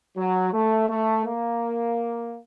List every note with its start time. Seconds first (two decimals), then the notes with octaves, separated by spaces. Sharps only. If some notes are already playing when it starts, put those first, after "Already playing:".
0.17 F#3
0.53 A3
0.88 A3
1.24 A#3